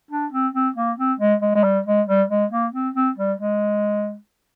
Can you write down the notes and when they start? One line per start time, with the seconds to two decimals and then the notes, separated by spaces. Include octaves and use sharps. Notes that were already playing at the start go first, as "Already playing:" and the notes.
0.11 D4
0.32 C4
0.54 C4
0.76 A#3
0.98 C4
1.20 G#3
1.42 G#3
1.55 G#3
1.64 G3
1.86 G#3
2.08 G3
2.30 G#3
2.52 A#3
2.74 C4
2.95 C4
3.18 G3
3.39 G#3